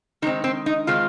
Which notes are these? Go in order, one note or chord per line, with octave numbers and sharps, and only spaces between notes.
D#3 G#3 C4 D#4
C4
D#4
D#3 G#3 C4 F4